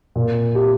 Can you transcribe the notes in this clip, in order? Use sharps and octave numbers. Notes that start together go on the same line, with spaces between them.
A#2
G4